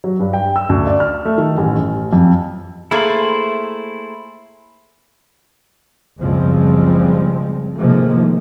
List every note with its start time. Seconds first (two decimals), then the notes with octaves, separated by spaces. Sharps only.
0.04 F#3
0.19 G2
0.33 G5
0.56 E6
0.69 D2
0.87 D5
1.00 F6
1.25 A3
1.38 D#3
1.58 A1
1.77 A1
2.13 F2
2.91 A3 A#3 E4 G#4 C5 B5
6.20 F#1 C#2 F3 G3 G#3 C4
7.77 A2 C3 D#3 F3 G#3 A#3